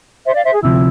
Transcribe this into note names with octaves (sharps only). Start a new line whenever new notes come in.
C5 E5
D5 F5
C5 E5
G#4
D2 C3 F3 E4